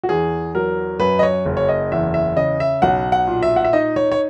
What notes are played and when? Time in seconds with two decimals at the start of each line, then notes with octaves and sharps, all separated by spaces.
0.03 F#4
0.09 E2 G#4
0.55 F#3 A#4
1.00 F#2 B4
1.19 D#5
1.23 C#5
1.45 F#1
1.57 C#5
1.69 D#5
1.92 E2 E5
2.14 E5
2.36 C#3 D#5
2.60 E5
2.82 B1 F#5
3.12 F#5
3.27 A#2
3.43 E5
3.56 F#5
3.64 E5
3.73 D#4 D#5
3.96 C#5
4.12 C#5